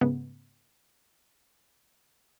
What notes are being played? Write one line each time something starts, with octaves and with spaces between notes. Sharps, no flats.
G#2 C#3 G#3 A3 B3